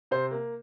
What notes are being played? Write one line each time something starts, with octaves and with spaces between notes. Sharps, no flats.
C3 C5
A#3